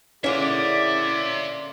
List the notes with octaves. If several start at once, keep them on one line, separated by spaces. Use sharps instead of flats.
D3 A#3 C#4 E4 G#4 D5 E5 C6